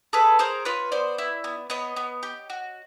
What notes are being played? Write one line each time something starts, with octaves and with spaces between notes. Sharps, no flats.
G#4 A4 B4
G#4 A#4 C5
F4 B4 C#5
B3 C5 D5
E4
B3
B3 C#5 D#5
B3
G4
F#4